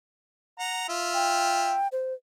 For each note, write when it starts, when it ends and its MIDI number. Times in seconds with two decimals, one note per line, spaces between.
0.59 0.86 78
0.59 0.86 82
0.89 1.77 65
0.89 1.77 76
1.14 1.88 79
1.92 2.14 72